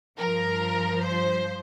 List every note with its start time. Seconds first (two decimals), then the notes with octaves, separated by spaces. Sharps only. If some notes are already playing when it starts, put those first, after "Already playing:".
0.18 G2 F3 A#4
1.06 C5